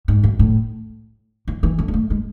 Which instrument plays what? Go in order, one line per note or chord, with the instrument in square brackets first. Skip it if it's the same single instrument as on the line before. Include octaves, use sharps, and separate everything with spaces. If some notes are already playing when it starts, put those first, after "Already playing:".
[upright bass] G#2
F#2
A2
E3
E3
D3
G#3
A3
G#3